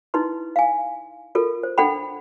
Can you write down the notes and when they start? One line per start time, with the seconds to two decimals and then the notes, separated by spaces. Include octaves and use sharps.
0.14 D#4 E4 B4 C6
0.56 F5 G#5
1.35 F4 A4 A#4
1.63 C5
1.78 D4 A4 F#5 G5 B5